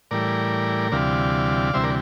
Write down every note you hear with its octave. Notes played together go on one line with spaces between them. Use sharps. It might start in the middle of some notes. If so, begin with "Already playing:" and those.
A2 E3 G3 A#4 D5
D2 C3 E3 G3 D5 F5
D2 C3 E3 G3 C5 E5
A#4 D5